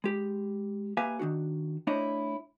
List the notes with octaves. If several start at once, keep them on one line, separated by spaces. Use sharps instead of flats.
G#3 G4
A#3 G4 B4 E5 F5 G#5
D#3 A#3 D4 F#4
A3 D4 E4 C5 C#5 D#5